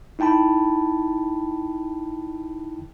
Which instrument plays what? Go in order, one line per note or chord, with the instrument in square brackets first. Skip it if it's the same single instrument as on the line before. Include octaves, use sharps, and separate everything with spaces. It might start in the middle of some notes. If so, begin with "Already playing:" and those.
[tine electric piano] D#4 E4 G5 A5 B5